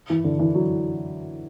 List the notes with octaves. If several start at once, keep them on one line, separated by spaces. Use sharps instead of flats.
E3
D3
E3
F#3